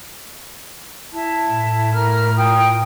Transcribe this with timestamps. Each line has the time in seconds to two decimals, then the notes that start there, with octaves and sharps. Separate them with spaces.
1.13 E4 A5
1.48 A2
1.94 A#4 A#5 F6
2.36 F4 G5 D#6